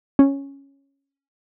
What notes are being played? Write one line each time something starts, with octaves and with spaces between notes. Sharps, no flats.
C#4